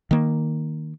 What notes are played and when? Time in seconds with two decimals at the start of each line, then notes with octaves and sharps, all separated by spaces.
0.11 D#3 A#3